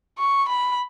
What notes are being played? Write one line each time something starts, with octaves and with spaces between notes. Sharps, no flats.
C#6
B5